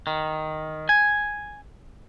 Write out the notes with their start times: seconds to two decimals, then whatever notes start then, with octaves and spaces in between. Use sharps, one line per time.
0.07 D#3
0.89 G#5